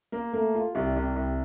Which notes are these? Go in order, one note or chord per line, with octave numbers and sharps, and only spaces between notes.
A#3
A3 A#3 A4
F4
C2 G3 G4
C2
C2